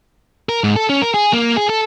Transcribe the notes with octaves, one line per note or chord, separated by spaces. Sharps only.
A#4
G#2
A4
C#4
A#4
G#4
A#3
G#4
A4